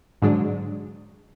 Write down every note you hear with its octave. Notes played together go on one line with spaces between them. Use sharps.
G#2 D3 F#3 G#3 D4